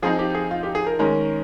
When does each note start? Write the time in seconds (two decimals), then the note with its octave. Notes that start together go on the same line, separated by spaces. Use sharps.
0.02 F3 C4 D#4 G#4
0.19 G4
0.35 G#4
0.51 F4
0.63 G4
0.75 G#4
0.87 A#4
0.99 D#3 G#3 C#4 A#4